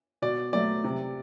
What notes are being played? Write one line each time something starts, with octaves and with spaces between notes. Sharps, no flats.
B2 D5
F#3 A3 D5
C3